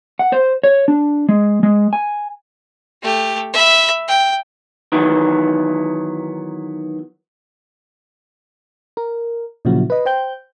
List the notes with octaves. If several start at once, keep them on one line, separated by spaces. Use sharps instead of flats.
F#5
C5
C#5
D4
G#3
G#3
G#5
A3 G4
E5 B5
G5
D#3 E3 F#3 B3
A#4
A#2 C#3 F3 F#3 E4 F#4
B4 D#5
C5 G5 G6